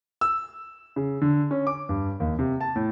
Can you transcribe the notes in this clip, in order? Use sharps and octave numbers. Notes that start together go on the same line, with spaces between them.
E6
C#3
D3
C#4
D6
G2
D#2
C3
A5
A2